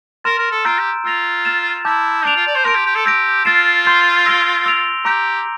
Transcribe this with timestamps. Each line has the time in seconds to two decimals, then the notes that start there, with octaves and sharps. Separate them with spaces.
0.24 A#4 C6 F6 A6 E7
0.38 A#4
0.51 A4
0.65 F4 A#5 E6 G6 D7
0.78 G4
1.05 F4 E6 A#6 F7
1.45 F6 A6 E7
1.85 E4 A5 D6 G6
2.25 D4 G6 D7 F7
2.36 F4
2.47 D5
2.55 C5
2.65 A#4 C6 G6 D7
2.75 G4
2.86 G4
2.95 A4
3.06 G4 E6 A#6 D7
3.45 F4 F6 A6 C7 E7
3.85 C6 G6 C7 G7
4.26 E6 A#6 D7 G7
4.66 E6 A#6 D7 F7
5.05 G4 A#5 D6 G6 A#6 D7